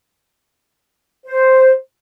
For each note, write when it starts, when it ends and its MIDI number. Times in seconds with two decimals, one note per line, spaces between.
1.26 1.73 72